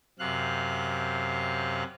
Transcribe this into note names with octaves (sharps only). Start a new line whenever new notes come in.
F#2 C3 F5 F#6